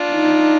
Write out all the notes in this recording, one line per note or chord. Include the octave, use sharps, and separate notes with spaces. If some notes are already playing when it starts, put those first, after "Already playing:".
Already playing: D4 F4
D#4